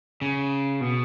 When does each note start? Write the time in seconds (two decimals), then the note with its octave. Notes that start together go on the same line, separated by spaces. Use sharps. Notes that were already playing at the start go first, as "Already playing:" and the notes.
0.22 C#3
0.81 B2